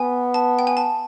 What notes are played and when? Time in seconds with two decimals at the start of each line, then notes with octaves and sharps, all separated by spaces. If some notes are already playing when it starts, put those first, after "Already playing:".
Already playing: B3 G#5
0.34 A5
0.59 G5
0.67 G#5
0.77 A5